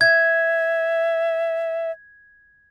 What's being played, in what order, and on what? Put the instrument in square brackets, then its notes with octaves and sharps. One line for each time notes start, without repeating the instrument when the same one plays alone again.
[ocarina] E5 [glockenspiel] G#6